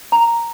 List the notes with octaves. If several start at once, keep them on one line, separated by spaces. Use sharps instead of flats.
A#5